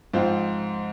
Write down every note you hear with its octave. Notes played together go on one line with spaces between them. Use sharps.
G#2 F3 C4 F4 C5